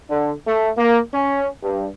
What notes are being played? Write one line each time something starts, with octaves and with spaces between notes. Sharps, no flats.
D3
A3
A#3
C#4
G2